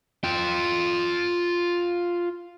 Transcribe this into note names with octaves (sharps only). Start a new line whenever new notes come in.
F4 G5